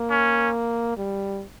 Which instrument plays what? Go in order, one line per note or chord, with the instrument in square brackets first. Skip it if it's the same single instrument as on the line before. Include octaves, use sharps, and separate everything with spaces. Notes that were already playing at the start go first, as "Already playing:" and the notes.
Already playing: [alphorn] A#3
[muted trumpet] C#4
[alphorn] G3